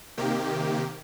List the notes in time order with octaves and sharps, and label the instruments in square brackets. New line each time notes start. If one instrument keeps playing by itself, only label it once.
[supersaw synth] C3 D#3 A#3 G4